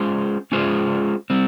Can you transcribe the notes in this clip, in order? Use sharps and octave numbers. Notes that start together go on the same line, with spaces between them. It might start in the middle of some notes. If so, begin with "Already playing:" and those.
Already playing: G#3 C#4 F4 G#4 C5
G#3 C#4 F4 G#4 C5
G3 C4